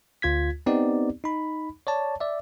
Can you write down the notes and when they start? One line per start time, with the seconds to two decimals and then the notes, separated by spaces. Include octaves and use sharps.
0.22 D2 F4 G#6 B6
0.66 B3 C4 D#4 G4 D5
1.24 D#4 B5
1.87 C#5 D5 A5
2.20 D5 E5